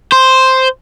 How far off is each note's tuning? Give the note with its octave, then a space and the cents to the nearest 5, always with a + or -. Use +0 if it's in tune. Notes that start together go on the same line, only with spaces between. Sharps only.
C5 +0